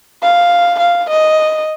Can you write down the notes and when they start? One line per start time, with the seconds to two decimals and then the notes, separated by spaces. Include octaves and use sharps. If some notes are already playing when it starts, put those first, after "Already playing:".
0.22 F5
0.80 F5
1.10 D#5